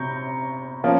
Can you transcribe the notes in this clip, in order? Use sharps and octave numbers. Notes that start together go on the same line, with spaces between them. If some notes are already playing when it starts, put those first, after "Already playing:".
Already playing: C3 A#5 C#6 G6
F3 A#3 C#4